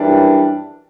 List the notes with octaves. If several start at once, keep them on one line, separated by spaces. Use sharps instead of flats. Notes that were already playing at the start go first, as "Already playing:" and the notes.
Already playing: F#2 E3 G3 D4